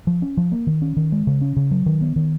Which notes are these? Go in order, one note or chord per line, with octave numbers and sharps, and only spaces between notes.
F3
C#4
F3
A#3
D#3
C#4
D#3
G#3
C#3
C#4
C#3
F#3
D#3
B3
D#3